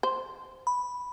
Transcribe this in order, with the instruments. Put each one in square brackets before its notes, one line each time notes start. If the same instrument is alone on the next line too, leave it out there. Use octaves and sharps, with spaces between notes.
[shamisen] C5
[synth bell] B5